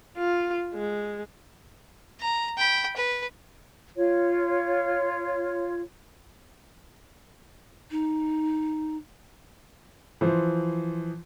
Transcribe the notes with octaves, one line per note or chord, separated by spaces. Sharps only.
F4
G#3
A#5
G5 B5
B4
F4 C#5
D#4
E3 F3 C5